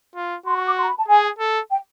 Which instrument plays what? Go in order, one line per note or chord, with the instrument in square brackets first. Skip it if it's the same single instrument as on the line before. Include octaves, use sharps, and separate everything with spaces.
[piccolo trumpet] F4
[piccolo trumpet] F#4 [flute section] C6
[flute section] C#6
D6
C6
A#5
B5
A5
[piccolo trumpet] G#4 [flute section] G#5
[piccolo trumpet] A4
[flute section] G5